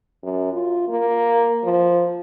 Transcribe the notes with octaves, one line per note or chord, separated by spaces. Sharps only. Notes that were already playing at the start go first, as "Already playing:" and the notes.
F#2
F4
A#3
F3